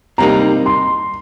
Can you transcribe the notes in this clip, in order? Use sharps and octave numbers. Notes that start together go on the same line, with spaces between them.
C3 G3 A#3 D#4 A#5
C6